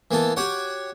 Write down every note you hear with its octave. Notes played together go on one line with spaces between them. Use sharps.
E3 A#3 B3 A4
F#4 G4 C#5 F#5